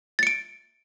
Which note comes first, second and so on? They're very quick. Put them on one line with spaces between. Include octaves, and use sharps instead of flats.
A6 C#7 D7